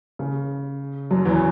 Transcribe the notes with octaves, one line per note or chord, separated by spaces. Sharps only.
C#3
F#2 F#3
E2 E3